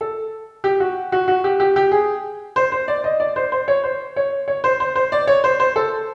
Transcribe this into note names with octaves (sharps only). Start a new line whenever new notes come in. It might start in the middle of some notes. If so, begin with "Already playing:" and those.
A4
G4
F#4
F#4
F#4
G4
G4
G4
G#4
C5
C5
D5
D#5
D5
C5
C5
C#5
C5
C#5
C#5
C5
C5
C5
D5
C#5
C5
C5
A4